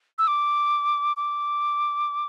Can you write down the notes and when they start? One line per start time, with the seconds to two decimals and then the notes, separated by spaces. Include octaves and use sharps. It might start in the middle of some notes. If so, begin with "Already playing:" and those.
0.18 E6
0.27 D6
1.17 D6